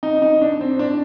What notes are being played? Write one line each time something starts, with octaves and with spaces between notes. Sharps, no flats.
D#4
D#4
D4
C4
D4